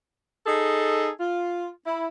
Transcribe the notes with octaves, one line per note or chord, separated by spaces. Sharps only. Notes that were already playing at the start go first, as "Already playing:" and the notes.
D#4 G#4 A4
F4
E4